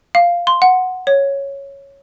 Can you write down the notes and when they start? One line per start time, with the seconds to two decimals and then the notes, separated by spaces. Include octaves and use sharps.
0.15 F5
0.47 C6
0.62 F#5
1.07 C#5